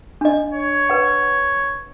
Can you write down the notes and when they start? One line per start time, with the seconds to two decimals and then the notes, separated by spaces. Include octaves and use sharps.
0.21 D4 D#5
0.53 C#5
0.90 B4 F#5